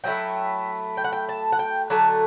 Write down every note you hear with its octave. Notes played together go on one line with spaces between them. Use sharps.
F#3 A3 E4 G5
G5
F#5
G5
A5
F#5
G5
D3 F#3 A3 A5